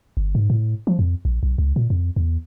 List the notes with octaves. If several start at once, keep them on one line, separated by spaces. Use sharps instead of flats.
G1
G#2
A2
F3
F2
A#1
B1
C#2
A#2
F2
E2